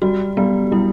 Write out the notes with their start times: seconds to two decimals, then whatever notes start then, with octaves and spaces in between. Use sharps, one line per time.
0.02 G3 F#4
0.37 G3 B3
0.72 G3 E4